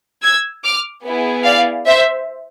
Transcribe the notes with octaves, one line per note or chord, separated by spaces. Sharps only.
E6 G#6
D6 F6
B3 E4 G#4
D5 F5
C5 E5